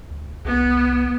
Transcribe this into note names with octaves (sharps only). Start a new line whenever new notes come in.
D2
C2 B3